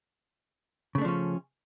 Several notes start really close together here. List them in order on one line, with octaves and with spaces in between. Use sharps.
C#3 A3 D4 F3 C#4